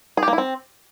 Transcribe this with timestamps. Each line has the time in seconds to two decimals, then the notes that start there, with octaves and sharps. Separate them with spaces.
0.17 G#4
0.23 G4
0.28 A#3
0.33 E4
0.38 C4